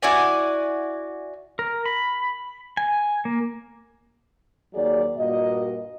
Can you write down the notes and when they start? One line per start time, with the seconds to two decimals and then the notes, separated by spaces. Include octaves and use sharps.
0.02 E4 F#4 D5 G#5
1.59 A#4
1.86 B5
2.77 G#5
3.25 A#3
4.73 D#2 F#3 G#4 D5
5.17 G2 A#2 A#3 F#4 D#5